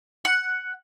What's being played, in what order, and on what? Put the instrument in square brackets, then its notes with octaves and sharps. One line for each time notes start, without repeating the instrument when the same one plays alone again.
[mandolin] F#5